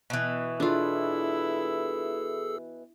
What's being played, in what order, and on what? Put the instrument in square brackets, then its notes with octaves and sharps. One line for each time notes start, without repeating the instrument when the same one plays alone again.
[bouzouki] B2 E3
[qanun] D4 F4 [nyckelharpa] E4 [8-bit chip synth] G#4 A4 E6